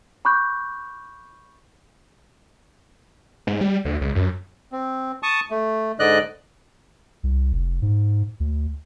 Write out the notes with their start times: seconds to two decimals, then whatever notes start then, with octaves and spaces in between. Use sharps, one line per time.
0.25 B5 C#6 D6 F#6 G6
3.47 G#2
3.61 G3
3.85 D2
4.01 C#2
4.15 F#2
4.72 C4
5.23 A5 C#6 D#6
5.50 A3
5.99 G#2 D3 D5 D#5 F#6
7.23 C2
7.53 F1
7.82 G#2
8.40 D2